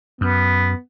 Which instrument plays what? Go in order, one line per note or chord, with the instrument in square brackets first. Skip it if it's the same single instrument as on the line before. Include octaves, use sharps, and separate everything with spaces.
[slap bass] F#2 [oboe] B3